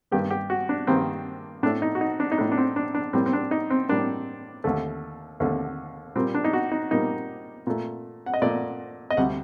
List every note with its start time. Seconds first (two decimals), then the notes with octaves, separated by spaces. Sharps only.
0.11 G2 D#3 G3 A#3 G4
0.31 G4
0.50 F#4
0.69 D4
0.87 G2 D#3 G3 A#3 C4
1.63 A2 D4
1.66 A3
1.82 D#4
1.95 F#4
2.01 D#4
2.20 D4
2.32 D#4
2.38 A2 A3 D4
2.52 D4
2.58 C4
2.76 D4
2.95 D4
3.13 A2 G3 A#3 C4
3.26 C4
3.33 D4
3.51 D#4
3.70 C4
3.89 A2 G3 A#3 D4
4.64 D#2 D3 A3
5.40 D#2 D3 A3
6.15 A#2 G3 A#3 C4
6.35 D4
6.44 D#4
6.53 F#4
6.72 D#4
6.91 A#2 G3 A#3 D#4
7.67 A#2 A3
8.26 F#5
8.34 D#5
8.42 A#2 A3 D5
9.10 D#5
9.17 D2 C3 G3 F#5